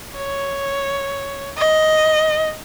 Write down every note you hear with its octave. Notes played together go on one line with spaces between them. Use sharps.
C#5
D#5